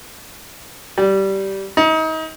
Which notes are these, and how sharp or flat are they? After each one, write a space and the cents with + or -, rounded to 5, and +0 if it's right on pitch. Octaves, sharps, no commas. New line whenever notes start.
G3 -15
D#4 +35